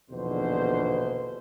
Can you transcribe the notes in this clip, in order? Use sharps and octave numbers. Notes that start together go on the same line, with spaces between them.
A#1 E2 B2 D3 D#3 C5